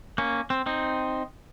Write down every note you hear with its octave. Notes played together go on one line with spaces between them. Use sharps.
A#3 C#4
C4
C4 D#4